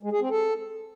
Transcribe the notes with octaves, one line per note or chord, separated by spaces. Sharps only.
G#3
G#4
C4
A4